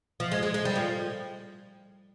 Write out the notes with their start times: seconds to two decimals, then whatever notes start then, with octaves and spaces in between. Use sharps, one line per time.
0.20 F3
0.32 G#3
0.43 G#3
0.54 G#3
0.65 G3
0.76 F3